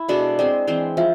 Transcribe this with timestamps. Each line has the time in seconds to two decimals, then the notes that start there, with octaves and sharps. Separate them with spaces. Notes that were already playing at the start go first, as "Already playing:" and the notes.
Already playing: E4
0.09 B2 G#3 D4 A4 D5
0.39 G#3 C4 G#4 D5
0.67 E3 G#3 C4
0.97 F3 E5